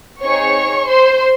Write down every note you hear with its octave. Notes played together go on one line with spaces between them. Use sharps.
C4 D#4 G#4 C#5 C#6
C5 C6